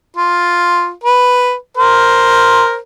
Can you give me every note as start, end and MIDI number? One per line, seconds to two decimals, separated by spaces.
0.17 0.91 65
1.04 1.54 71
1.77 2.77 70
1.77 2.77 72